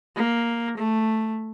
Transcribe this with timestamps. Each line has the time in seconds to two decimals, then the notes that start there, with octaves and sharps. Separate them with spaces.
0.16 A#3
0.77 A3